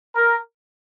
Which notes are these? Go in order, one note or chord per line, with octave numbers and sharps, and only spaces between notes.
A#4